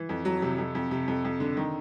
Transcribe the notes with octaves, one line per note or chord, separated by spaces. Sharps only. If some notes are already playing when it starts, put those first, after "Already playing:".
Already playing: E3
F2
F#3
C3
F2
F2
C3
F2
F2
D3
D#3